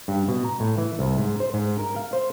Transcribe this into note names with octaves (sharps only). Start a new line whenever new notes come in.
G2
B2
A#5
A2
E3
C2
G#2
C5
G#2
A#4
F5
C5